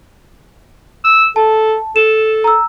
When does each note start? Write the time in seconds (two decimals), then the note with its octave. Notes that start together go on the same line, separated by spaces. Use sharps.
1.04 E6
1.36 A4 A5
1.96 A4 E7
2.44 A#5 E6